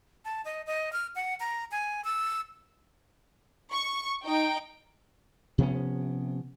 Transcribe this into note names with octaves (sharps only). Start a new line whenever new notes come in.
A5
D#5
D#5
F6
F#5
A#5
G#5
E6
C#6
D#4 G5
C3 F3 B3 C#4